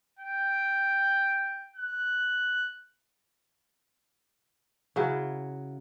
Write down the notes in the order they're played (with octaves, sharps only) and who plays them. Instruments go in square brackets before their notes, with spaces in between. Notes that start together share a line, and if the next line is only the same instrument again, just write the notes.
[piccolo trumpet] G5
F#6
[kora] C#3 F#3 E4